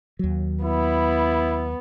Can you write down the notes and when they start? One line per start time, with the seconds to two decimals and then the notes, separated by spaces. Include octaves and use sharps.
0.19 D#2 F#3
0.63 B3 E4